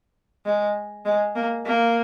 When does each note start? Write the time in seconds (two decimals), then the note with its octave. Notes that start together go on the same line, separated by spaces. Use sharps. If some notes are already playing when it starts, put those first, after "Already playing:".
0.46 G#3
1.05 G#3
1.36 A#3
1.66 A#3